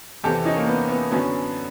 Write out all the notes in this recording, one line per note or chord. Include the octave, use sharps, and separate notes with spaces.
E2 C3 E3 G4 A4
C#4 D#4
A#3
B3
B3
F#2 D3 F#3 B3 C#4